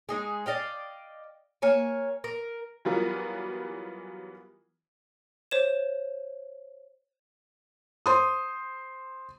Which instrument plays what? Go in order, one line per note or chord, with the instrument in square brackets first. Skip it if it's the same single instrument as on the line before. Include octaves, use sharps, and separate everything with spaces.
[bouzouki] G#3 D#4 G#4
D5 D#5 F5 G5
A#3 C#5 G#5
A#4
[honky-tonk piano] E3 F#3 G3 B3 F4 A#4
[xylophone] C5 C#5 E7
[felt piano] C5 C6 D#6